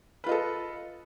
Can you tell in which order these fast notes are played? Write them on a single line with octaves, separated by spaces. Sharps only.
B4 F4 D#5 A4